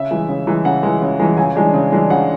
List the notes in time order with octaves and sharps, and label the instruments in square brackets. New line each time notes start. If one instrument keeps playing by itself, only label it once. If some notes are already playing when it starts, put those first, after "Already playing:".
Already playing: [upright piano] C#3 E5
E3 G#3
C#3
E3 G#3
C#3 F#5
E3 G#3
C#3
E3 G#3
C#3 G#5
E3 G#3 D4
C#3
E3 G#3 D4
C#3 F#5